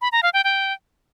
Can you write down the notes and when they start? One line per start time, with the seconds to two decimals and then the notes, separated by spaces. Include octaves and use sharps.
0.01 B5
0.12 A#5
0.23 F5
0.33 G5
0.44 G5